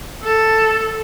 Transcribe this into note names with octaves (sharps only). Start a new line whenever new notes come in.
A4